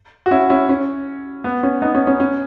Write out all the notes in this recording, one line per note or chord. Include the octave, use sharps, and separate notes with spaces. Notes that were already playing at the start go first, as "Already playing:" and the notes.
F#4
C#4 E4
C#4 E4
C#4
B3
C#4
B3 D#4
C#4
C#4
C#4